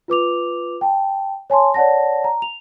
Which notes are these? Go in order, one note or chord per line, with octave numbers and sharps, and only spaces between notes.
F4 B4 D6 F7
G5 A5
C#5 G#5 A5 C6
C#5 D5 F#5 A5 A#6
A#5
F7